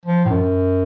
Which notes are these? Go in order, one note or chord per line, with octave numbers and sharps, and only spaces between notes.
F3
A2
F#2